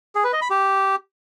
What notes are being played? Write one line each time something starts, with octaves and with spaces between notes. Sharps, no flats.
G#4
B4
D#5
B5
G4